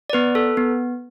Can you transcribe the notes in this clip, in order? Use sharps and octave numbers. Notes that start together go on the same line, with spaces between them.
D5
B3 B4
A4
B3